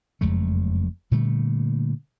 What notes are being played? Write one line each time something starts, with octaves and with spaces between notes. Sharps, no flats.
F#1 F2 G#3 A3
A#2 D3 G3 A3